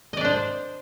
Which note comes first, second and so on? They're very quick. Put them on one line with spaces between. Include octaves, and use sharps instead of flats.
D#5 D5 D4 C5